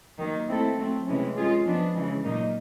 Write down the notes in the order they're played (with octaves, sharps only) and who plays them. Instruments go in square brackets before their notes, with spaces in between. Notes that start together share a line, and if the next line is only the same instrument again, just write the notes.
[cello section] D#3 F#3 A#3
A3 C4 E4 A4
F#3 A3 C4
C3 E3 G#3 C#4
G#3 C#4 F4 G#4
F3 G#3 B3 D4
C#3 E3 G#3
A#2 F#3 A#3 D#4